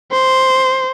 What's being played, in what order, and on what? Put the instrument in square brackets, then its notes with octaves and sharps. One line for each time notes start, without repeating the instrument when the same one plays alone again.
[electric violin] C5